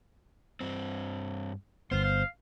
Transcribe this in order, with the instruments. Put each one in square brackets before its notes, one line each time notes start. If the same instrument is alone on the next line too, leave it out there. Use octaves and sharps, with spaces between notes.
[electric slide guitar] G2 C4
[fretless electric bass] G1 B3 [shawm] F4 [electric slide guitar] C5
[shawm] F5